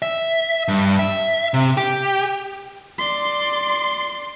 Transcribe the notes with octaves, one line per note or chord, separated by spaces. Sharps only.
E5
G2
E5
C3
G4
D5 C6